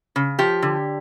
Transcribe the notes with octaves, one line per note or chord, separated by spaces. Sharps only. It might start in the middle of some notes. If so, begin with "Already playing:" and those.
C#3
F3 G4
D3